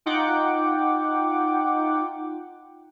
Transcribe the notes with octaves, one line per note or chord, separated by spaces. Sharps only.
D#4 F4 F#5 G5 D6